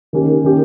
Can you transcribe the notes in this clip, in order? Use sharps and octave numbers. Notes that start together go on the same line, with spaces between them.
D#3 A#3 C#4 G4
D#3 A#3 C#4 G4